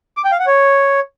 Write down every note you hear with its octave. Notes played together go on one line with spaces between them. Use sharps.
D6
G5
F5
F#5
C#5